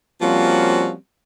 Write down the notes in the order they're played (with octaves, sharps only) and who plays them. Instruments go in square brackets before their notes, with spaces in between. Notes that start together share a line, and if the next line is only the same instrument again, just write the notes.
[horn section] F3 G3 A#3 C4 C#4 F#4